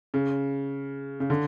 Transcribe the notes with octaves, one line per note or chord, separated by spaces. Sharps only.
C#3
C#3
D3